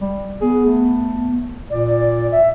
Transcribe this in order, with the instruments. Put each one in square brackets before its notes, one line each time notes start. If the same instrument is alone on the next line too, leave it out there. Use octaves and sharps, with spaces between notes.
[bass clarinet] G3
[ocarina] B3 [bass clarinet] G#4
[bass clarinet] A3
[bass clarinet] A#2 [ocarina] D5
[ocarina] E5